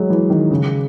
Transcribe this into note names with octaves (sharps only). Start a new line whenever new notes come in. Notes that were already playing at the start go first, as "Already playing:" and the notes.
Already playing: F#3 G#3
E3
D#3
C#3